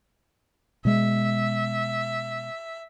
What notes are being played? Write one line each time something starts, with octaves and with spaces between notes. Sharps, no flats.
B2 G#3 E5